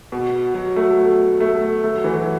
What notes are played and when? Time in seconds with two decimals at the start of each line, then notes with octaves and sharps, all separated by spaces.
0.12 B2
0.54 F#3
0.76 A3
0.97 A3
1.41 A3
1.84 A3
1.94 F#3
2.04 E3
2.15 F#3